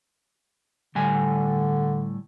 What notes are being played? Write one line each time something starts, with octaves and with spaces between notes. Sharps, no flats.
A2 D3 G3 G#5